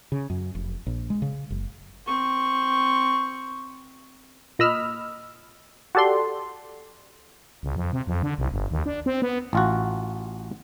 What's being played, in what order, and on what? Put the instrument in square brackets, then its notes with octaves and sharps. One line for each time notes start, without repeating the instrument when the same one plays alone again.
[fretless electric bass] C#3
F#2
F1
A#1
G#3
C#3
F#1
[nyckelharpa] C4 C#6
[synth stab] A#2 D#5 B5 E6 F6
F#4 G4 A4 D5 C6
[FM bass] C#2
F2
C3
F2
D3
C2
G1
D#2
D4
C4
B3
[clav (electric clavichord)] A1 F4 F#4